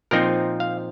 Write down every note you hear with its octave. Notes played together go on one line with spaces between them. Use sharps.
A#2 F3 C4 D#4 A#4
F5